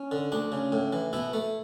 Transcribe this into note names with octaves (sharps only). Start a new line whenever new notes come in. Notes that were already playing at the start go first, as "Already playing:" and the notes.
Already playing: C#4
D3
D2 D4
C#3
A2
E3
B2 E4
A3